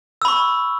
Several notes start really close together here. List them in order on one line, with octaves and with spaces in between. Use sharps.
E6 B5 C#6